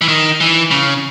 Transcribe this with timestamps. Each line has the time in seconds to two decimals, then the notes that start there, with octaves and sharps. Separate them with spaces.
0.01 E3
0.08 D#3
0.40 E3
0.71 C#3